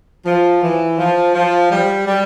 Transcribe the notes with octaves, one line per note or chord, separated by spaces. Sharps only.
F3
E3
F3
F3
G3
G3